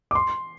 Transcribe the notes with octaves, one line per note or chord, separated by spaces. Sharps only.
D6
C6